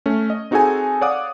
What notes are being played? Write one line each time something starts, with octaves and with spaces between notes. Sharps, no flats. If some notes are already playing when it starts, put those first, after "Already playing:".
A3 C#4
D#5
C4 D#4 F#4 G#4 A4 G#5
C#5 D5 F5 F#5 D6 D#6